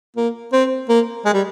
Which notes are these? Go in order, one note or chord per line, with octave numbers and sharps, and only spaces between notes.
A#3
C4
A#3
G#3
G3